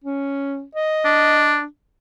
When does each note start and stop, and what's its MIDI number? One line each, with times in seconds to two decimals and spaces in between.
0.04 0.63 61
0.75 1.54 75
1.05 1.64 62